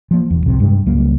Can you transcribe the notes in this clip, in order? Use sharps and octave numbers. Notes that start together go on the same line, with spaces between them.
F3 A#3
E1 E2
C2 A2 C3 F#3
G2 G#3
C#2 F#3 G3 A#3